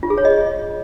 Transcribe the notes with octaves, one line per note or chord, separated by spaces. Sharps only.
F4
G#4
C#5
D#5